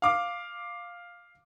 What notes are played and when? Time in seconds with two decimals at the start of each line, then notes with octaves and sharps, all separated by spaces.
0.02 F5 D6